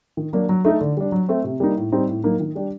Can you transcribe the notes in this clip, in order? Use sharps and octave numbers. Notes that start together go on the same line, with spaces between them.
D#3
F#3 A#3 D4
F#3
A3 D#4 A4
D3
G3 D4
F#3
A3 C4
C3
G3 A#3 D#4
A2
G3 C4 D#4
A2
F#3 A#3 D#4
D#3
G3 D4 G4